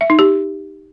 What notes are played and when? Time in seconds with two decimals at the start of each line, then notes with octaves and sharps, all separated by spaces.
0.01 E5
0.10 D#4
0.19 G4